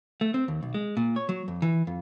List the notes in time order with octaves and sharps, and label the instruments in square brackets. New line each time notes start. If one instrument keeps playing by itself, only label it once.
[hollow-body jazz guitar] A3
C4
D#2
B1
G#3
A#2
C#5
F#3
F2
E3
F2